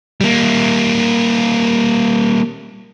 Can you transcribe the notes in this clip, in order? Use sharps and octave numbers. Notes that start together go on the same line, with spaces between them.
G3 A#3